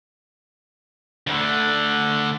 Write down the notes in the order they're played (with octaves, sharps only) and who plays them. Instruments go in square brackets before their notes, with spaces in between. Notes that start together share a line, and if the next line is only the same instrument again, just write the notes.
[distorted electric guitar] D2 D3